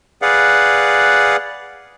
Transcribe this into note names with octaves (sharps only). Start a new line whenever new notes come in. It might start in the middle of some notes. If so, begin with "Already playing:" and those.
G#4 B4 D5 F5 F#5